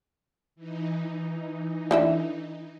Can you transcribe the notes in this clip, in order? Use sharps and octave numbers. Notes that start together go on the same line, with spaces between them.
E3 D#4
D3 E4 E5